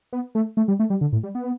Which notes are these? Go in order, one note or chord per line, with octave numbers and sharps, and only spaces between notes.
B3
A3
A3
G3
A3
G3
D3
A2
G3
B3